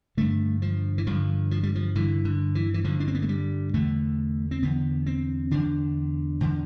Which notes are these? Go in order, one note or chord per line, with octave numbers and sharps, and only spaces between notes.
G2 D3 A3
F3
E3
G2 D3 F3
F3
G3
F3
G2 D3 E3
D3
E3
E3
G2 D3 F3
D4
C4
B3
A3
G3
E2 D3 A3
C4
E2 D3 B3
C4
E2 D3 D4
E2 D3